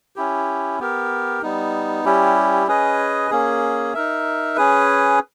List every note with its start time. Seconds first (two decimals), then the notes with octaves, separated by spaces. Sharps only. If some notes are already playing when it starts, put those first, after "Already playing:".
0.16 C#4 E4 G4
0.80 B3 G4 A#4
1.42 G3 B3 D#4
2.05 G3 C#4 E4 G4
2.67 C#4 G#4 B4 D#5
3.31 A#3 C#4 G#4
3.94 D#4 A#4 E5
4.56 C#4 G#4 B4